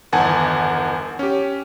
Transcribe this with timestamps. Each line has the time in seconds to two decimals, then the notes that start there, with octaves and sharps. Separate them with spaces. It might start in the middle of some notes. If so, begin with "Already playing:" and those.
0.13 G1 E2 D#3 F#5 G#5 A5
1.19 C#4 G4